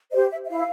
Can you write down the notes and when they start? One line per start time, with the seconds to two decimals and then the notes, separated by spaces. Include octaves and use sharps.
0.12 C5 D#5
0.16 G4
0.31 E5
0.45 E5
0.49 E4 F5